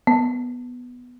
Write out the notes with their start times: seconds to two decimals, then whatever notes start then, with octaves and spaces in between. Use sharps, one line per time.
0.07 B3